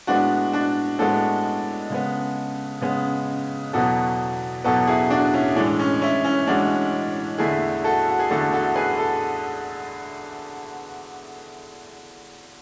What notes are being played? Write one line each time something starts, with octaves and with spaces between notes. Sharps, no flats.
A2 G#3 B3 D4 F#4
D4 F#4
A2 G#3 B3 F#4 A4
C#3 G#3 B3
C#3 G#3 B3
E2 B2 F#3 B3 F#4 A4
E2 B2 F#3 B3 F#4 A4
E4 G#4
D4 F#4
C#4 E4
A2 E3 G#3 D4
C#4
C#4 E4
C#4 E4
A2 E3 G#3 D4 F#4
E2 D3 A3 E4 G#4
F#4 A4
F#4
G#4
E2 D3 A3 F#4 A4
F#4 A4
G#4 B4
A4